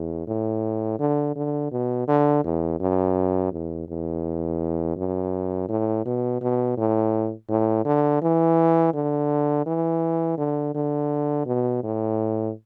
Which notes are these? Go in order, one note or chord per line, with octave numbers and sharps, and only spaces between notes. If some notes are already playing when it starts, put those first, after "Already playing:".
Already playing: E2
A2
D3
D3
B2
D3
E2
F#2
E2
E2
F#2
A2
B2
B2
A2
A2
D3
E3
D3
E3
D3
D3
B2
A2